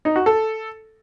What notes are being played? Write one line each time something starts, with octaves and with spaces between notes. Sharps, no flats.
D#4
F#4
A4